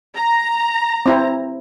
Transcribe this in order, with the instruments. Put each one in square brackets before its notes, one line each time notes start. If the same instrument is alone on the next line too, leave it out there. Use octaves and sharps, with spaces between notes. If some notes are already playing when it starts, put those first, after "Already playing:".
[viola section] A#5
[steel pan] C4 E4